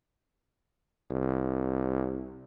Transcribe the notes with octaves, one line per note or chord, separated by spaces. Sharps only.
C2